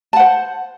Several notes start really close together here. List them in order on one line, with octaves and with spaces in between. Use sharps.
A5 F#5 C5